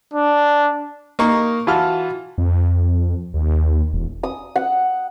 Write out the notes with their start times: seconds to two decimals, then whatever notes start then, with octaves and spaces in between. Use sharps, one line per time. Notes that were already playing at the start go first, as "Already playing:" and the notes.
0.14 D4
1.19 A#3 D#4 A#4 C#6
1.67 E3 F4 F#4 A5 F6
2.38 F2
3.34 D#2
3.93 E1
4.23 D#6
4.56 F#5